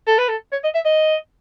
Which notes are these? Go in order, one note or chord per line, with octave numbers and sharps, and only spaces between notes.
A4
B4
A4
C#5
D#5
E5
D#5